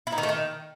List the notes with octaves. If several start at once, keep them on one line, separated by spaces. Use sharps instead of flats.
E4
D#4
D#3
A3
D#3